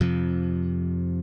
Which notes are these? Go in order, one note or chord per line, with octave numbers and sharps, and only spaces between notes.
F2 C3 F3